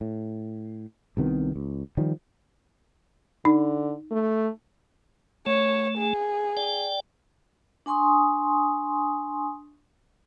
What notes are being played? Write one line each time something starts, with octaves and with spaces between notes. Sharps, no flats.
A2
C2 C3 D#3 B3
C#2
D#3 F3 G3
D3 D#4
A3
A3 C#5
G#4
D5 G5
D4 G#5 C6 C#6 D#6